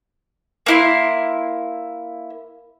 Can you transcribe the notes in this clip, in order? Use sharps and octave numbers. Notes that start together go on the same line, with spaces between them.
A#3 E4 C6